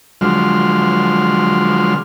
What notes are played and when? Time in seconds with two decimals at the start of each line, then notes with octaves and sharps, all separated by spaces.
0.21 D3 F3 F#3 G#3 C6 F6